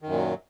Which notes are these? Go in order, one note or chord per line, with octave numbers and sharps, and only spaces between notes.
F#2 A#2 D#3 F#3